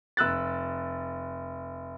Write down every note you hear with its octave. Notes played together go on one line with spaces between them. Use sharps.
F1 E6 F#6 A6